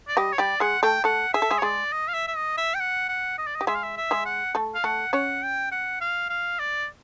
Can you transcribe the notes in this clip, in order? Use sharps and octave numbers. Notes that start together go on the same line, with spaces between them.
D5
G3 G4 D#5
C#5
G3 G4 D5
G#3 G#4 F#5
A3 A4 G5
A3 A4 F#5
G#4 E5
A4
G#3 G#4
C#5
G#3 G#4 D5
D#5
F5
E5
E5
D#5
E5
G5
F#5
F#5
D#5
D5
D#5
G4
G#3 G#4 E5
F5
E5
E5
G#3 G#4
F#5
A3 A4
F5
A3 A4 F#5
C#4 C#5 F#5
G5
F#5
F5
F5
D5